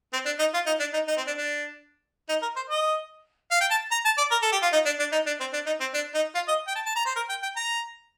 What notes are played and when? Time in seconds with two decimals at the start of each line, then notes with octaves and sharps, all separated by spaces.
0.13 C4
0.25 D4
0.39 D#4
0.54 F4
0.66 D#4
0.80 D4
0.93 D#4
1.07 D#4
1.17 C4
1.27 D4
1.38 D4
2.29 D#4
2.42 A#4
2.56 C5
2.70 D#5
3.51 F5
3.60 G5
3.71 A5
3.91 A#5
4.05 A5
4.18 D5
4.31 A#4
4.42 A4
4.52 G4
4.62 F4
4.73 D#4
4.85 D4
4.99 D4
5.12 D#4
5.26 D4
5.40 C4
5.53 D4
5.66 D#4
5.80 C4
5.94 D4
6.15 D#4
6.35 F4
6.48 D#5
6.67 G5
6.75 A5
6.86 A5
6.96 A#5
7.06 C5
7.16 A#4
7.29 G5
7.43 G5
7.56 A#5